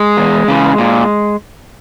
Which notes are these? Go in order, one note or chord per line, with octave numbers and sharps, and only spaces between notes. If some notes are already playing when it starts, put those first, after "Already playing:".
Already playing: G#3
E2
C#3 E3
A#2